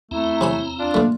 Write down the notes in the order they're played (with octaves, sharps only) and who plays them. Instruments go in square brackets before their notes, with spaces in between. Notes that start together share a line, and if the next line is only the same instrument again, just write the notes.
[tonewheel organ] E2 C4 A#5 [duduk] A3 [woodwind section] E4
[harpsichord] C3 C#4 B5
[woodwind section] D4 [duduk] F4
[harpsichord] A#2 A3